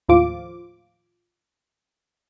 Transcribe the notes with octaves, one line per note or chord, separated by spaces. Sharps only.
D#2 A2 F3 F4 D6